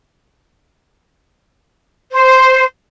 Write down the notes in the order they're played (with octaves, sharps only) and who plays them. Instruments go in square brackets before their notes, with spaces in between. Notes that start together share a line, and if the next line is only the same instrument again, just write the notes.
[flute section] C5